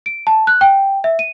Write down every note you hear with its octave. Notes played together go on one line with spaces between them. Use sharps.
D7
A5
F#6
G5
E5
D#7